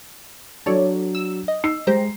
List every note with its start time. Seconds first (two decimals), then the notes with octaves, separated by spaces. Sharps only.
0.66 F#3 D4 A4 C#5 D5
1.15 E6
1.48 D#5
1.64 D#4 E6 C7
1.87 G#3 G4 C5 A#5